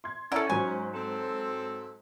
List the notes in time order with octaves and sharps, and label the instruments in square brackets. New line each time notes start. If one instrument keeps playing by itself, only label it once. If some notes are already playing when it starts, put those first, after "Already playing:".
[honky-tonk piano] C6 G#6
[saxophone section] C#4 [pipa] E4 A4 [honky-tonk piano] D5 F#5 A#5
[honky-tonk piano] G#2 F#3 [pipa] G#5
[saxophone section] C4 A4